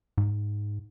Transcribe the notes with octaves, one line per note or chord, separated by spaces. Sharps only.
G#2